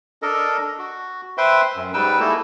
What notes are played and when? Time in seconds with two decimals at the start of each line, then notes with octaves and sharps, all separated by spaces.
0.22 D4 A4 A#4 D#5
0.79 F#4
1.38 B4 C5 E5 G5 C6
1.75 F#2
1.94 G#2 G3 D#4 B4 G5 E6
2.20 G#3 A#3 D#4 E4 F#4 A4